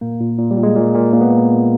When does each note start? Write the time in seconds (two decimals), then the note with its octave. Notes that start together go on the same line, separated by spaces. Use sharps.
0.01 A#2 A#3
0.21 A#2
0.39 A#2
0.51 G3
0.57 A#2
0.63 G#3
0.76 A#2
0.95 A#2
1.13 A#2 A#3
1.21 B3